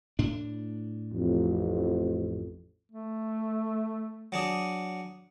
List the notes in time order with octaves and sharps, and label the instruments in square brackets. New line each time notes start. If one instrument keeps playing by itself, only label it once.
[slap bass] A2 D4
[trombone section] A1 F2
[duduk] A3
[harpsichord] F#3 D4 G#4